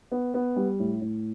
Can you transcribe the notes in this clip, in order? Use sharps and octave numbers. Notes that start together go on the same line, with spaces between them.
B3
B3
G3
A2
A2